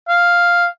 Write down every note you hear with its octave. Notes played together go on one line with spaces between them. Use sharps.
F5